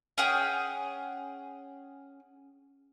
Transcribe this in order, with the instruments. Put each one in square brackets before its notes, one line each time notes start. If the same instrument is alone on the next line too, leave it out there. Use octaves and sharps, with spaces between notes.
[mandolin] C#4 G#4 F#5 G5